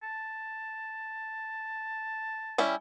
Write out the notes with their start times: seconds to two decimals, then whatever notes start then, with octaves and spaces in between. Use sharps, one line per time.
0.03 A5
2.58 G3 C#4 E4